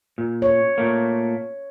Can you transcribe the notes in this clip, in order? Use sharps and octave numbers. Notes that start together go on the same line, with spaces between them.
A#2
C#5
A#2 A3 A#3